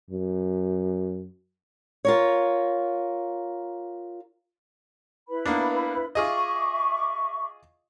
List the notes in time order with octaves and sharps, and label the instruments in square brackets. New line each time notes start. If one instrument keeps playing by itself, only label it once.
[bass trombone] F#2
[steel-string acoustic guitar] F4 A#4 C#5
[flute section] E4 B4 B5
[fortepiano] A#3 B3 D4
[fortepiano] F4 G#4 D#5 [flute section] E5 C#6 D6